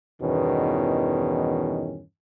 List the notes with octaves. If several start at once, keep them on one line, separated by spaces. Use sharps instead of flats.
E2 G2 B2 D#3 E3 C#4